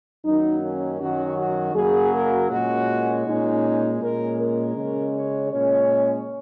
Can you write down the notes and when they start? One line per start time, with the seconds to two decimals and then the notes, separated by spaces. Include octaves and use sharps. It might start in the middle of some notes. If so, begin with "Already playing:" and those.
0.25 F#2 D#3 F#3 A#3 D#4
0.63 C#4
1.00 F#2 D#3 F#3 C#4 F#4
1.38 F#4
1.75 F#2 C#3 F#3 A#3 G#4
2.13 A#4
2.50 A#2 G#3 C#4 F#4
3.25 A#2 G#3 C#4 D#4
4.00 A#2 G#3 C#4 A#4
4.39 A#4
4.75 C#3 G#3 C#4
5.13 C#5
5.50 A#2 G#3 C#4 C#5